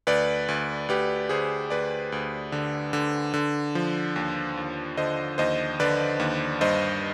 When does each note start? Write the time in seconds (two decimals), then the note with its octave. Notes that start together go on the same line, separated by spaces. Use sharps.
0.07 D2 B4 D5
0.48 D2
0.89 D2 G4 B4
1.29 D2 G#4 C5
1.70 D2 B4 D5
2.12 D2
2.52 D3
2.93 D3
3.34 D3
3.75 F3
4.16 D#2
4.57 D#2
4.97 D3 C5 D#5
5.38 D#2 C5 D#5
5.80 D3 B4 D5
6.20 D#2
6.61 G2 C5 D#5